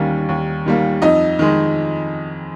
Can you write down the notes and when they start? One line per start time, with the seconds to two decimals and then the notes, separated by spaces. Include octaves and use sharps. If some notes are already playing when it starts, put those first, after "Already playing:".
Already playing: D#2 D#3 G3 A#3 C#4
0.29 D#2
0.66 D#3 G3 A#3
1.02 F2 D#4 D#5
1.39 D#3 G#3